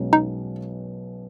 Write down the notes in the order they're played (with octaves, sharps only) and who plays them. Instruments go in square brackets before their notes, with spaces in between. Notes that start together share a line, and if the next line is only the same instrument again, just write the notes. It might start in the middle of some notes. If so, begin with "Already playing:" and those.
Already playing: [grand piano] B1 B2 G#3 C#4
[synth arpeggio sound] D#4